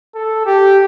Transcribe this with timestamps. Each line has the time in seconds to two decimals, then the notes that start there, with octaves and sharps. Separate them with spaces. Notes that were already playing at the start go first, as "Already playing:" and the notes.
0.15 A4
0.46 G4